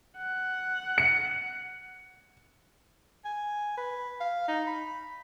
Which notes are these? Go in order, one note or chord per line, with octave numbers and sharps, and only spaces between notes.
F#5
C#7
G#5
B4
F5
D#4
B5